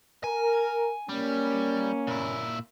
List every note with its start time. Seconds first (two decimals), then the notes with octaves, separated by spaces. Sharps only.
0.24 A#4 G#5
1.09 G3 A#3 C#4
2.07 A#2 E4